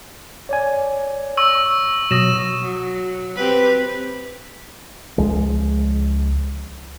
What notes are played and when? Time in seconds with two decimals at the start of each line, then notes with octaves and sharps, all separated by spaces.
0.49 C#5 D5 G#5
1.37 C#6 E6
2.11 B2 F#3 D#6 A#6 E7
2.62 F#3
3.36 C4 G4 B4
5.18 C#2 F3 G#3